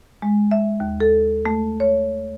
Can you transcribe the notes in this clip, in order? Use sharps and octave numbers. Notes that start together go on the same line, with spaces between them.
G#3
E5
D#2
A4
A3
C#5